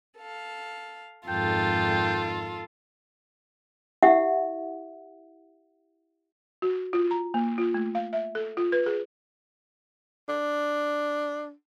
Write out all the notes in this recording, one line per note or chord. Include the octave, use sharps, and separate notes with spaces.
A4 F5
F2 G#2 D#3 F4 A4 G5
E4 G4 E5 F#5
F#4
F4
A#5
A#3
F4
A3
F5
E5
A4
F4
B4
G#4
D4